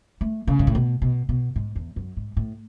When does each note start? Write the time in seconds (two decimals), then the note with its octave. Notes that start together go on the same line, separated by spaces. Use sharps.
0.21 A3
0.47 C#3
0.59 G#2
0.67 A2
0.75 B2
1.02 B2
1.29 B2
1.56 G#2
1.76 E2
1.96 F#2
2.17 G#2
2.37 A2